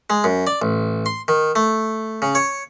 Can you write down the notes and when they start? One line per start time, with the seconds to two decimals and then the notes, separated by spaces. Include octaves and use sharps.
0.10 G#3
0.24 F#2
0.47 D5
0.62 A1
1.06 C6
1.28 D#3
1.56 A3
2.22 C#3
2.35 C#5